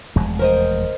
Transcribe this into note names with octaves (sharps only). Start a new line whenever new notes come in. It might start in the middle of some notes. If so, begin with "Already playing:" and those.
F1 E2 G#3
A#4 C5 D#5